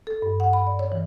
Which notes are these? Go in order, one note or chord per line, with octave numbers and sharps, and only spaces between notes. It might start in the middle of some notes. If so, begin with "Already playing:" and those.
A4
G2
F#5
B5
D5
C#5
E3